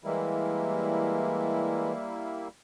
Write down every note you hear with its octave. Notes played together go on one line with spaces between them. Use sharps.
E3 G3 G#3 A#3 E4